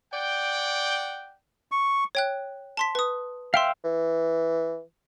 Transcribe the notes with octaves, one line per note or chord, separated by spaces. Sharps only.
D5 F#5 G5
C#6
C#5 G5 F#6
A5 C6 B6
B4 D#6
E5 F5 G5 C6 E6
E3